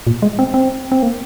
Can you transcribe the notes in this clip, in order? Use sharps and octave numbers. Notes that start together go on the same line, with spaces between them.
A#2
G#3
C4
C4
C4
A#3